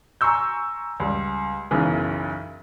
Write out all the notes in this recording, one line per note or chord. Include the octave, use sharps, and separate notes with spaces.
G#5 A#5 C6 C#6 E6 G6
C#2 G3
B1 F#2 C#3 E3